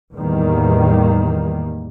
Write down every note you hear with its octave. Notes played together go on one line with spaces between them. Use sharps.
E2 A2 D#3 G3 A#3